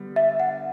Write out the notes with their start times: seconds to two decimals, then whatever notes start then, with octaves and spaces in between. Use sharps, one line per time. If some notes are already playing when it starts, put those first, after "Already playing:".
Already playing: D3 G3 B3
0.16 E5
0.40 F#5